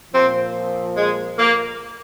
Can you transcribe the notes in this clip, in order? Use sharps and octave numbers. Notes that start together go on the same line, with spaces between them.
A#2 F3 C4
G#3
A#3